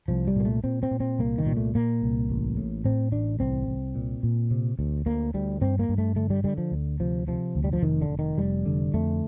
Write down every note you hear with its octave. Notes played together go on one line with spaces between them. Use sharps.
C2 F3
G3
A#2 A#3
A3
A#2 C4
C4
A#2
C4
C2 A#3
D#3
A#2
A3
A#2 A#3
C2
A1
A2
A2 C4
A1 D4
C2 C4
C2
A#2
A#2
C3
D2
D2 A#3
D2 G3
G2 C4
A#3
G2
A3
D3 A3
G3
D3 G3
F3
D2
C3 F3
C3 F3
D2
G3
F3
F1 D#3
D3
F1
D#3
F1 G3
D3
F2 A3